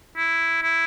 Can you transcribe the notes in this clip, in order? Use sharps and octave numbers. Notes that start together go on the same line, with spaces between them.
E4
E4